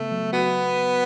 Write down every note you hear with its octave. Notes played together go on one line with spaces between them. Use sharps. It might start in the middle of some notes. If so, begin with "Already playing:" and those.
Already playing: C#3 A3 B3
F#3
B3 F#4